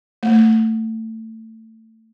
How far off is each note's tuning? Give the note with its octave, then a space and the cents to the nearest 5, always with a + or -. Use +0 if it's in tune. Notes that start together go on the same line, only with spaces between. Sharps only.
A3 +25